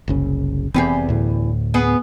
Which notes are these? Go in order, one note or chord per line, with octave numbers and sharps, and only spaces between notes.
F#1 C2 C#3
F1 E2 E3 C4 G4 G#4
D2 A2
B3 G#4